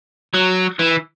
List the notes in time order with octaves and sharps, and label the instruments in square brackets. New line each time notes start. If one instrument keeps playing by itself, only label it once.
[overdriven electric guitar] F#3
E3